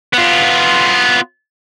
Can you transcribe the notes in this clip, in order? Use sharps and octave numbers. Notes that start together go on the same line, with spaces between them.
B3 F4